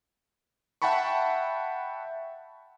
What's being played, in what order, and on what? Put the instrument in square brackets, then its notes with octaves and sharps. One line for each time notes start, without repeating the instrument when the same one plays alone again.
[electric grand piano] E5 F#5 G5 A5 B5 C#6